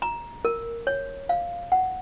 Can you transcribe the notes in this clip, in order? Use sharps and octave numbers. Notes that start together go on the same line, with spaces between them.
A#5
A#4
C#5
F5
F#5